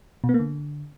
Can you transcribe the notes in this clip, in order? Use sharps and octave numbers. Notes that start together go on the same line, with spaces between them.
B2
B3
A#3
D3